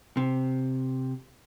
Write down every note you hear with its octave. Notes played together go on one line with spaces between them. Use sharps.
C3